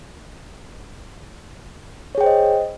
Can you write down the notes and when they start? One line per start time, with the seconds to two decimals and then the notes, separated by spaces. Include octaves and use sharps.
2.15 C#5
2.18 G#4
2.21 G5
2.23 C5
2.26 D#5